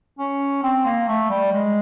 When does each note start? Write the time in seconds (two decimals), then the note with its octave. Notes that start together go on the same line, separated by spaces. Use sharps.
0.19 C#4
0.63 C4
0.85 A#3
1.08 A3
1.30 G3
1.52 G#3